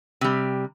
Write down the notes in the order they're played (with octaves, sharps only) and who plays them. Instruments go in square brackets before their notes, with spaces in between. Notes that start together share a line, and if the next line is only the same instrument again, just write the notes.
[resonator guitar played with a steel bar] C3 G3